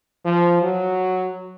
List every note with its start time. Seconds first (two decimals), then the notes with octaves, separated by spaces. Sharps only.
0.25 F3
0.62 F#3